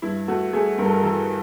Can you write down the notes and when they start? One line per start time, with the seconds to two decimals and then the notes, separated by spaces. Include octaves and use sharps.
0.02 G2 E4
0.28 A3 F#4
0.53 A3 G#4
0.78 G2 A#4
0.86 A4
0.92 A#4
1.02 E3 A4